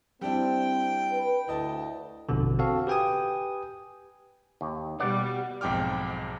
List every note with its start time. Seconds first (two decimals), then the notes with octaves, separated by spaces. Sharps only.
0.21 G3 C4 D4 E4 G5
1.12 B4
1.48 D2 E4 D#5 A5
2.29 A1 F2 B2 D3
2.59 C4 F#4 A4 F5
2.87 G4 B4 G5 G#5 D#6
4.61 D#2
5.00 B2 G3 D5 F#5
5.61 B1 F2 G#2 G5 D6 F6